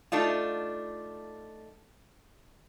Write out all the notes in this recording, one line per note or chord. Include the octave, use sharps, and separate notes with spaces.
A3 D4 D#4 F4